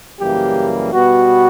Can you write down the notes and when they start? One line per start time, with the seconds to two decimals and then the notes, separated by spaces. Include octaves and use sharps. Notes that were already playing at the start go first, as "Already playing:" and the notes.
0.20 F#2 C#3 E3 G3 A#3 G4
0.94 B2 G3 B3 F#4